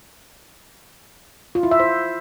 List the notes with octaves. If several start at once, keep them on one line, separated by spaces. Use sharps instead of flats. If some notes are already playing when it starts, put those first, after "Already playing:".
F4
E4
E5
C5